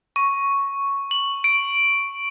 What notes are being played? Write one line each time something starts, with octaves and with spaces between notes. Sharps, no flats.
C#6
F#7
D7